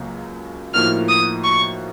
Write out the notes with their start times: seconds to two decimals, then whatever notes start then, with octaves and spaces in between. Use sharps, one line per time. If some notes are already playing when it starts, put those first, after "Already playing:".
Already playing: C#2 C#3 F#3 A#3
0.74 A2 F3 A#3 D#4 F#4 F6
1.08 D#6
1.44 C#6